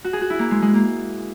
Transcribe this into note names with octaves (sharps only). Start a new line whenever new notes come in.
F#4
G#4
F#4
E4
A#3
G#3
G#3
A#3